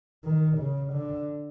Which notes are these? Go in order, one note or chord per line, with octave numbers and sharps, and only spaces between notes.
D#3
C#3
D3